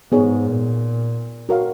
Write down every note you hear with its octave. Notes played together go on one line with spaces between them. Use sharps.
G#2 B3 D#4 G#4 C#5
A#2
F#4 A#4 C#5 F5